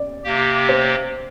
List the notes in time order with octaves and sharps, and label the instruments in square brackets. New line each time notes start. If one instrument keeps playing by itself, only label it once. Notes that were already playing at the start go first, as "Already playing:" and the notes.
Already playing: [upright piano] D5
[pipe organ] C3 A#3 G4
[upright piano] C5